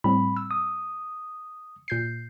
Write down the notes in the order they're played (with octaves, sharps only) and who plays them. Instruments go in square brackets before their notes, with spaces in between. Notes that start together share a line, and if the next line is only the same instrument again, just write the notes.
[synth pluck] A2 G3 C4 [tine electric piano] B5
[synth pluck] E6
[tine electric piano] D#6
[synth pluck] A#2 G6 C7